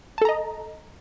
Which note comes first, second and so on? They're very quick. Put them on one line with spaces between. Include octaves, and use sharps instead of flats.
A5 A4 A#5 D#5